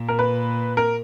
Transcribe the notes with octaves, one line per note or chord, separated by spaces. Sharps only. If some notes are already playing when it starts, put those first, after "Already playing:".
Already playing: A#2
A#4
B4
A#4